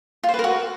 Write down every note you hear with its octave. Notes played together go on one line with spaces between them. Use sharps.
F4
C5
B4
A#4
F#4